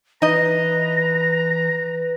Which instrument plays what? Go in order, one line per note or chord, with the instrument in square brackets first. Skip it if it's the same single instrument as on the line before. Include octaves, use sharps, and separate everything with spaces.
[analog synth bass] E3 [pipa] D#4 D#5 [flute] B4 [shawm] A#5